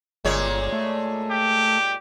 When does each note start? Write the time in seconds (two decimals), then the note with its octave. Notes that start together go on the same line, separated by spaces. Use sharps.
0.25 G1 A#2 G#3 C#5
0.72 A3
1.31 G4